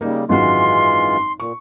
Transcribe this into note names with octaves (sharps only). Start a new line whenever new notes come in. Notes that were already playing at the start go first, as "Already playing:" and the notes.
C#3 G3 A#3 D#4
G#1 F#2 E3 G#3 F4 F#4 C6
A#2 C#6